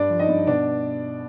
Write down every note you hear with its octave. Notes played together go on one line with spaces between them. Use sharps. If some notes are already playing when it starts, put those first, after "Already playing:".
Already playing: G2 D4 D5
F3
D#4 D#5
G2
B2 D4 D5